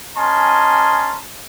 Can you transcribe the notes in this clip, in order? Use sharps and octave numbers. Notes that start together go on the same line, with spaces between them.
C#4 A#4 D#5 G#5 A5 C6